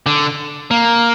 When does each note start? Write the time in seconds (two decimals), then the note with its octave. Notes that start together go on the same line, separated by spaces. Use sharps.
0.06 D3
0.71 A#3